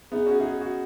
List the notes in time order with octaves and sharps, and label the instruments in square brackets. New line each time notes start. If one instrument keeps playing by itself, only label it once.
[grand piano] B3 D#4 [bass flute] G#4
[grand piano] C#4 F#4
D#4 G#4
G#4
F#4